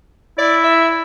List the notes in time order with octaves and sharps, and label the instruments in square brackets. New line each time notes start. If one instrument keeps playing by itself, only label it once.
[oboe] E4 [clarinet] D5
[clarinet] E5